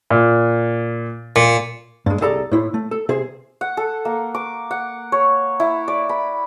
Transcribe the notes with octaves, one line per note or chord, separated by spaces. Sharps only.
A#2
A#2
G2 G#3
C2 G#4 A4 D5 A#5
A2 E4 C5
A3
A4
C3 G#4 C5
F#5
A4
A#3
D6
F#5
C#5
E4
D5
B5